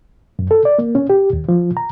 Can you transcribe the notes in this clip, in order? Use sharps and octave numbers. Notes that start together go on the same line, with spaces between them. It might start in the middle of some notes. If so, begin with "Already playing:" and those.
F#2
A4
D5
A#3
C#4
G4
D#2
F3
A#5